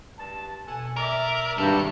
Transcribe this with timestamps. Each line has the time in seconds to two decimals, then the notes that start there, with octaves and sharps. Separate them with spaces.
0.18 G2 A5
0.67 B2 A4 F#5 G#5
0.96 A#4 D5 E5
1.58 G#1 G2 G3 A3 F#4 A4